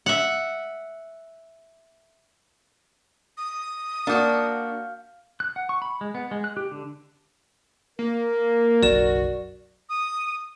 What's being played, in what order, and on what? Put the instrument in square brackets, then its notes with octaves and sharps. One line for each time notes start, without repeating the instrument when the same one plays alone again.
[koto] E5 F#5
[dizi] D#6
[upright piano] A#3 F#5 D6 [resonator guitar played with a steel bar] D4 F#4 [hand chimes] F5 F6 G6
[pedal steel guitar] F#6
F#5
C#6
B5
G#3
B3
G#3
F#6
G4
D3
[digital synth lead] A#3 [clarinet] A#4
[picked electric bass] F#1 B1 F#3 [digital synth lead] F#4 [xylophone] D5 E7
[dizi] D#6